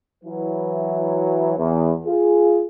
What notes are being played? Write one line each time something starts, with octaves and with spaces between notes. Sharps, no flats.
E3 F#3 E4 B4
E2
F4 G#4